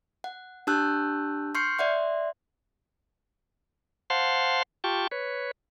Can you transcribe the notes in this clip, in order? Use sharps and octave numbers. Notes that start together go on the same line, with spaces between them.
F#5
D4 G4 A5 E6 F#6 G6
C6 C#6 F6 G6 C7 C#7
D5 E5 F#5 C6
C5 F5 F#5 A5 C6
F4 G4 G5 A5 C#6
B4 C#5